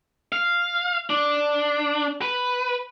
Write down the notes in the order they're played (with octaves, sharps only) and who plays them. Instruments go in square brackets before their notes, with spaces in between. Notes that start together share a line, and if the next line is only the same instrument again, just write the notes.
[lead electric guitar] F5
D4
B4